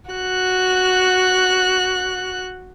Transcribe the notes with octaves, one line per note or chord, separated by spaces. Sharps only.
F#4 F#6